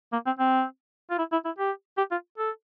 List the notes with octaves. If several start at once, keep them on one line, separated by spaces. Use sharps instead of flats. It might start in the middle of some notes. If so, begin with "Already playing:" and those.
A#3
C4
C4
F4
E4
E4
E4
G4
G4
F4
A4